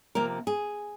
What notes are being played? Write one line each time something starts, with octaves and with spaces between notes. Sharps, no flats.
C3 F3 A#3 A#4
G#4